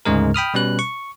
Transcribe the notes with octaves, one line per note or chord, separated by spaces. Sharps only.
D2 G#2 C#3 G#3 A#4
G5 B5 D#6 F6
B2 G3 C#4 B4 F#6
C#6